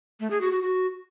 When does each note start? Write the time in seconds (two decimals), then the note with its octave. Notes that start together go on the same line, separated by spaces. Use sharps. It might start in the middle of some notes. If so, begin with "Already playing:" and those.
0.20 A3
0.31 G#4
0.41 F#4
0.52 F#4
0.62 F#4